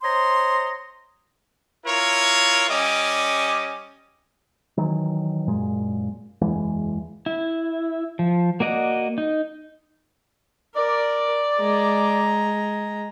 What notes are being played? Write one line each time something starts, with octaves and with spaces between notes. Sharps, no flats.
C5 C#5 D#5 A#5 C6
E4 F4 A#4 C#5
G3 C#4 D#5 D6
D#3 E3 F#3
G#1 F#2 A#2 G#3
F#1 E2 E3 G#3
E4
F3
A#3 F#4 D5 D#5 F#5
D#4
A#4 D5
G#3 A#5